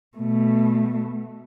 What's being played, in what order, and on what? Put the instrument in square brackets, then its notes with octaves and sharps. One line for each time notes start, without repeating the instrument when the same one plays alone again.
[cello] B2 A3